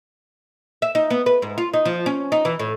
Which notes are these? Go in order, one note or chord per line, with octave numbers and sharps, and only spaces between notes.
E5
D#4
B3
B4
G#2
F4
D#4
F3
C#4
D#4
E3
A2